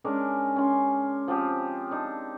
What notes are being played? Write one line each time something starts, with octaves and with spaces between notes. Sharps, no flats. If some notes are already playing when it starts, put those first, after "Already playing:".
G#3 C#4 D4 A#4
C#4 C6
F3 C4 G4
D4 D#4